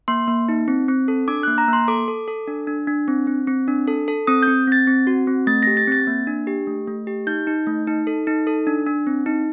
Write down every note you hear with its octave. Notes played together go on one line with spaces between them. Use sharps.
A#3 C6
A#3
D#4
C4
C4
A4
D4 D6
F#6
A#3
A#5
A#3
C6
A4 D6
A4
A4
D4
D4
D4
C4
C4
C4
D4
A4
A4
C4 D#6
G6
C4
C4 A6
C4
F#4
C4
A3 A6
A#6
G4
A6
C4 A6
A#3
D4
G4
A3
A3
G4
D#4 G6
D#4
A3
D#4
A4
D#4
A4
D4
D4
C4
D#4